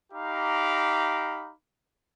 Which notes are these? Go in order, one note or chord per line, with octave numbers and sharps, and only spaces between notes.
D#4 G4 F5 A#5 B5 D6